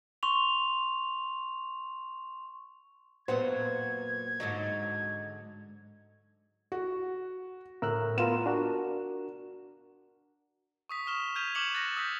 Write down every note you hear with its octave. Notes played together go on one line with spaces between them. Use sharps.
C6 C#6 F7
F#2 A#2 F#3 B3 C5 F#5 G#6
G#2 D3 F#3 D#5
F#4
A2 A#4 E6 F#6
B3 F4 A#4 E7
D4 F#4 A#4
C#6 D#6 B6
C#6 F6 E7 G7
F6 G6 G#6 B6 D#7 F7
C#6 D6 F6 C#7 E7 F#7
F#6 A6 A#6
D#6 E6 G6 B6